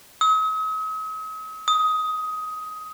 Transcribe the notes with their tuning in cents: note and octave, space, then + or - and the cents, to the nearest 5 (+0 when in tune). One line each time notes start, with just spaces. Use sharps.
D#6 +45
D#6 +15